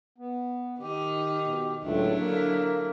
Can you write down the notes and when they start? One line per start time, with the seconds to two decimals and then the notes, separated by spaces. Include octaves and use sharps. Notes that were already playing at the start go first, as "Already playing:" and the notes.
0.18 B3
0.81 D#3 D#4 G4
1.46 B2
1.83 C#2 A2 D3 F#3 A3 D4 E4
2.20 D3 A#3